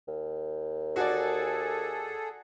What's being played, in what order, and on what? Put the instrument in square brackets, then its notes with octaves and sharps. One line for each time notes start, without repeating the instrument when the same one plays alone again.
[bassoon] D#2
[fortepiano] F#4 D5 [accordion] G#4 A4